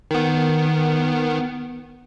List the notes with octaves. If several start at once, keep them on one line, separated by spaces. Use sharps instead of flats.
D#3 B3